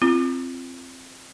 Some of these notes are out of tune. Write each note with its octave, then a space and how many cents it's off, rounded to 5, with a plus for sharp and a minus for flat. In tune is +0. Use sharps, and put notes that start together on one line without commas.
C4 +5 F4 -25